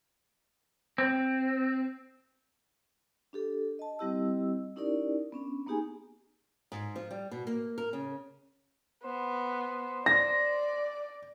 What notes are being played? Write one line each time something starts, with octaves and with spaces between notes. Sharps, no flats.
C4
D4 G4 A4
D#5 A5
G3 C4 E4 G4 D#5 E6
C#4 D#4 E4 G4 A#4 D5
B3 C#4 D4
A#3 B3 D#4 G4 G#4 G#5
G#2
F3
G3
B2
A#3
A#4
C#3
B3 C5
D5 A#6